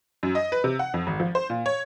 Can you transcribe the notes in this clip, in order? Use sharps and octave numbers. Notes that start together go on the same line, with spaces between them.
F#2
D#5
B4
C3
F#5
F2
G#1
F3
C5
A#2
C#5